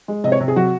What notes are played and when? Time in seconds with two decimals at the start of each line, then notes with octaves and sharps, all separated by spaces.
0.08 G#3
0.24 C3 D#5
0.32 C#5
0.40 C3
0.48 G#4
0.56 F#3 F#4